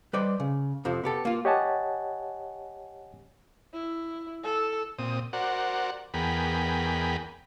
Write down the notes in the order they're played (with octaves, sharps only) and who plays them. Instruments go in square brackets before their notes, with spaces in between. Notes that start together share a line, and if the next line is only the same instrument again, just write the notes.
[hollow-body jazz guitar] G3 B4 C5 D5 D#5
C#3
F2 C3 F3
B3 G4 A4
A#3 F4
[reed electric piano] G4 C#5 D#5 F#5 G#5 A5
[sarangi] E4
A4
[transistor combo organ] A#2 C4 D#6
F#4 A#4 C5 D5 F#5
E2 B3 G#4 A#4 G5 B5